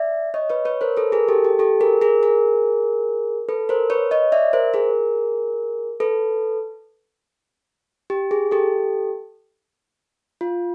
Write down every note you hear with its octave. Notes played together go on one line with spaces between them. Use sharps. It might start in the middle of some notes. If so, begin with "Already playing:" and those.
Already playing: D5 E5
C#5 D#5
B4 C#5
B4 C#5
A#4 C5
A4 B4
G#4 A#4
G4 A4
G4
G4 A4
G#4 A#4
G#4 A#4
G#4 A#4
A4 B4
A#4 C5
B4 C#5
C#5 D#5
D5 E5
A#4 C5
G#4 A#4
A4 B4
G4
G#4
G4 A4
F4